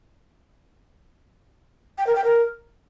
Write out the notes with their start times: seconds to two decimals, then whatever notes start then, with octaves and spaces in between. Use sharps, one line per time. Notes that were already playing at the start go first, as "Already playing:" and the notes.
1.98 G5
2.07 A#4
2.16 G5
2.24 A#4